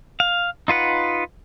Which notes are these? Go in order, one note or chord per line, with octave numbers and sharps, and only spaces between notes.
F5
D#4 F4 B4 F#5